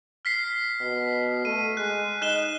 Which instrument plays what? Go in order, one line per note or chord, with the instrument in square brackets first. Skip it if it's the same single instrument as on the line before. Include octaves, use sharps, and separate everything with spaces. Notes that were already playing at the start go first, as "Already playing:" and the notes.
[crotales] F6 B6 C7
[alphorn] B2
[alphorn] A3 [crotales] D#7
[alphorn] G#3 [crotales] F#6
[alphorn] D#4 [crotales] F#6 E7 G7